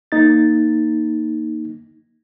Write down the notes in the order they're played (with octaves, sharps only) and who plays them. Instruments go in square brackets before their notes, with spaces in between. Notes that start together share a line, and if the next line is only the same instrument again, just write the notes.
[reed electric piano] A#3 D#4 A6